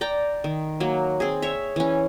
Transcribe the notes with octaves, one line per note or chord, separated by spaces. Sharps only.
D5 G5 A#5
D#3
F#3 A#3
C4 G#4
C#5 E5
E3 C#4